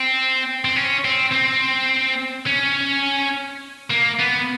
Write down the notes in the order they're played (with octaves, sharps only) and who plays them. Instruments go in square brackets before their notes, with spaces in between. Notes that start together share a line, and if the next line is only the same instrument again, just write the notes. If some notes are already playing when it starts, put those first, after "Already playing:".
Already playing: [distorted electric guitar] C4
C4
C#4
C4
C4
C#4
A#3
B3